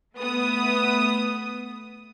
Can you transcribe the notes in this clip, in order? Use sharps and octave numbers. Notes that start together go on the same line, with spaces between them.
A3 B3 D#6